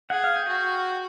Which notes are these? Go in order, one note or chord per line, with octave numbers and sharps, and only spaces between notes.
G#4 F#5
F5
G5
F#4